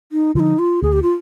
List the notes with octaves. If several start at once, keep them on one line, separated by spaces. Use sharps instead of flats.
D#4
D3 F3 D#4 F4
F4
D2 G#4
G4
F4